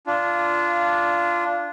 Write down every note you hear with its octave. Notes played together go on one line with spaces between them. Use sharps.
D4 F4